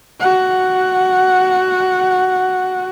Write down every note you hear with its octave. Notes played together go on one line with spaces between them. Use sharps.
F#4 F#5